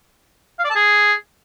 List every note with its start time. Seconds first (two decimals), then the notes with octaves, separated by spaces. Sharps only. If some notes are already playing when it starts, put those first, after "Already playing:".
0.59 F5
0.65 D5
0.70 A5
0.75 G#4